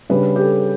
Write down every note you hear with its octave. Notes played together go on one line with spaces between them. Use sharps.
C#3 G3 D4 B4
G4
A4